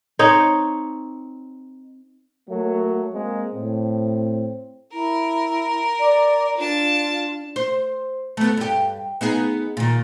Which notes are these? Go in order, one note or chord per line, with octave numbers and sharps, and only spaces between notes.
C4 D#4 C#5
F#3 A3 A#3
G#3 A#3 C4
A2 C4
E4 A#4
D5
D4 F4 A5
C5
A3 B3
G2 G4
B3 D#4 G#4
A#2 D#3